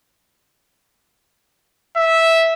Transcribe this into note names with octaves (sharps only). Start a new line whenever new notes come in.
E5